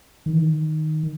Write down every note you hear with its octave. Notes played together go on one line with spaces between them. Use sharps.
D#3
E3
D#3